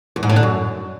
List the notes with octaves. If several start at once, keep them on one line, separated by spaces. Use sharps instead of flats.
E2
G#2
A2
D3
F#2